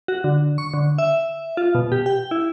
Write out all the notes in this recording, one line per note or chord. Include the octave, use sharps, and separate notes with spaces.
F#4
D3
C#6
D3
E5
F4
B2
G4
G5
E4